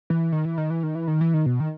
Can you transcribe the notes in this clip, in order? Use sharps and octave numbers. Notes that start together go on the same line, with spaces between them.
E3
D#3
E3
D#3
E3
D#3
E3
D#3
E3
D#3
B2
D#3